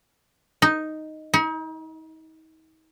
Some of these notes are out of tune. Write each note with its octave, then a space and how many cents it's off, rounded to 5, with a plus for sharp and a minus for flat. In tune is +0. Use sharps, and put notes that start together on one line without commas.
D#4 +0
D#4 +40